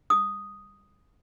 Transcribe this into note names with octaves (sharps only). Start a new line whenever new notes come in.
D#6